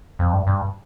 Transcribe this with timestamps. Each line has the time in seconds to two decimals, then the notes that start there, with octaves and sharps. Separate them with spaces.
0.19 F2
0.33 G2
0.47 G2